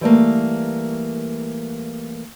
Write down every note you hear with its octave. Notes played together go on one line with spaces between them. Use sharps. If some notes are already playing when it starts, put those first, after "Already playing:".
E3 G3 A3 A#3